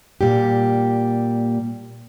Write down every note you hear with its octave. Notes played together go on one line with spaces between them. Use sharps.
A#2 G3 G4